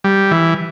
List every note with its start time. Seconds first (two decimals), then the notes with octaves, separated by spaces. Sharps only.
0.04 G3
0.31 E3